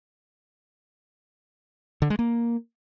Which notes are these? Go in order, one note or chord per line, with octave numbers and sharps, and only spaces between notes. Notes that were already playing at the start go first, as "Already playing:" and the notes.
D3
G#3
A#3